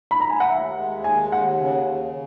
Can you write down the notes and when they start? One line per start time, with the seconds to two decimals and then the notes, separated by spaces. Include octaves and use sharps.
0.11 B5
0.20 A#5
0.30 G#5
0.40 F#5
0.50 D#2 E5
0.78 G#3
1.04 D#2 G#5
1.32 D#2 F#5
1.60 C#3
1.87 C#3